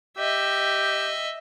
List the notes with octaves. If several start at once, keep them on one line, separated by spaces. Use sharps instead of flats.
G4 D#5 E5